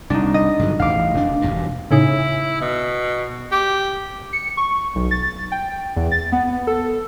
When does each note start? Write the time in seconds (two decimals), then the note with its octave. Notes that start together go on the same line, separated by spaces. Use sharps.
0.10 C2 D4 D#4
0.34 D#5
0.59 G2 D3 F#3
0.80 A1 E2 F5 D6
1.14 F1 D4
1.42 E1 E2 G2
1.91 A2 C#3 D#4 E4
2.61 B2
3.52 G4
4.33 C#7
4.57 C#6
4.95 B1
5.11 A6
5.52 G5
5.96 E2
6.11 A6
6.32 B3
6.67 A4